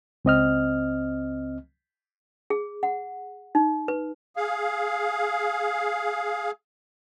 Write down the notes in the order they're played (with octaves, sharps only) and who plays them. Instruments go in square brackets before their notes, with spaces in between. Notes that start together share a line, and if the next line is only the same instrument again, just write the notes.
[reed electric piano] C#2 C4 D#5 F6
[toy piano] G#4
F#5
D#4
B4
[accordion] G#4 F5